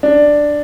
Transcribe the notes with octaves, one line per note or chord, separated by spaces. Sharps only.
D4